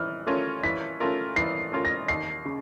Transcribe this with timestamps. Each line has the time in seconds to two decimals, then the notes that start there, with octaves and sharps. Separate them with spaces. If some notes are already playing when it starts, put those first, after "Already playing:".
Already playing: E3 C#4 F6
0.27 A3 C#4 F4 A#4
0.63 E3 B6
1.00 A3 C#4 F4 A#4
1.36 E3 C7
1.72 A3 C#4 F4 A#4
1.85 A#6
2.08 D#2 C7
2.45 C#3